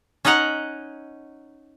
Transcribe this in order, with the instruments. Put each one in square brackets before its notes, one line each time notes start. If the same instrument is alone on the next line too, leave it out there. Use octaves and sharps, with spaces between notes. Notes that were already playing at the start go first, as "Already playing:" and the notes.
[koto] C#4 D#4 D#5 F#5 A#5